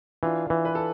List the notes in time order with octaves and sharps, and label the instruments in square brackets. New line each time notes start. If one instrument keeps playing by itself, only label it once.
[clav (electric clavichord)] E3 [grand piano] D4 F4
[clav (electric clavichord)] E3
[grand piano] B4
A4